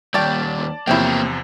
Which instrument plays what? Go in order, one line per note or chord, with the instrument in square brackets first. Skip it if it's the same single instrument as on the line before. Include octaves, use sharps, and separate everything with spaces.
[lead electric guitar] D#2 G3 [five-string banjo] C#5 G5 [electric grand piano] D5 A5 A6
[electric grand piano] E2 C3 F3 [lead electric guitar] A#3 C4 [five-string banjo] E4 C#5 G5